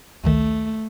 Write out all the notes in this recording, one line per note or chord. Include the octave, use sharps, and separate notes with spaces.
A1 D2 D#3 A3